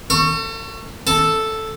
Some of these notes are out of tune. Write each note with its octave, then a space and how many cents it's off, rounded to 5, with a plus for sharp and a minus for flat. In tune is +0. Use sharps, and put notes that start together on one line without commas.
A4 +40 C#6 -5
A4 +0 A5 +0